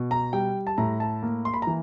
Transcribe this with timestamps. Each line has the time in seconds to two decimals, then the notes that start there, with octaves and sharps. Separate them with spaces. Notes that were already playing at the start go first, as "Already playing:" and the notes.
Already playing: B2
0.11 A#5
0.33 G3 G5
0.67 A5
0.78 A2 A#5
1.00 A5
1.23 A#3
1.45 C6
1.54 B5
1.62 A#5
1.67 E3